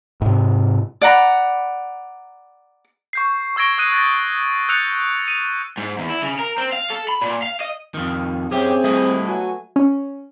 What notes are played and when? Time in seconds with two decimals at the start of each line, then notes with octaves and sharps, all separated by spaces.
0.22 G#2 C3
1.02 D5 F#5 A#5 B5
3.13 C#6 G6 C7
3.56 C#6 E6 G#6 A#6 D7 G7
3.78 D#6 E6 F#6 D#7
3.92 F#6 A6 A#6
4.69 E6 F#6 G6 A6 C#7 F7
5.28 D#7 F7
5.78 G#2
5.99 E2
6.10 E4
6.22 C#3
6.39 A#4
6.58 C4
6.73 F5
6.90 A4
7.09 B5
7.21 A#2
7.43 F5
7.60 D#5
7.94 F2 D#3
8.51 F#2 C4 C#4 G4 G#4 E5 G5
8.84 G3 A3 E4 D#5
9.28 F#3 B3 F#4 G#5
9.76 C#4